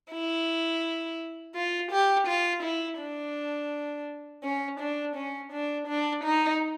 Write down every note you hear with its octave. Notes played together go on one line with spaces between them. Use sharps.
E4
F4
G4
F4
E4
D4
C#4
D4
C#4
D4
D4
D#4